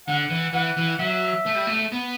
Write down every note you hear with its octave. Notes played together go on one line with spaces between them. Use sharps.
D3 F#5
E3
E3 F#5
E3
F#3 E5
A3
G3
A3
B3